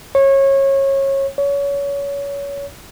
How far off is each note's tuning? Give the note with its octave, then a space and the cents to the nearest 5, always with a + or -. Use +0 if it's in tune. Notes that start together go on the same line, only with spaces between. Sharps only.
C#5 -25
C#5 +25